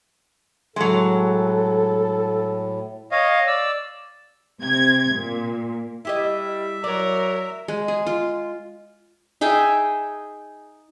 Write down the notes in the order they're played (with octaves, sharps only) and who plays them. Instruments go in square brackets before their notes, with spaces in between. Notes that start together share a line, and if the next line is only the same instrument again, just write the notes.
[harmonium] A2 [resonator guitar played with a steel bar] F#3 G#3 [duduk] A4
[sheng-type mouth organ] C#5 D#5 F5
D5 E6
[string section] C3 G#6
A#2
[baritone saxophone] G3 [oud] E4 G4 D#5 [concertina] E5
[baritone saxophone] F#3 [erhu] A#4 [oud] D5
[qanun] G#3
G#4
F4
D#4 G#4 E5 G5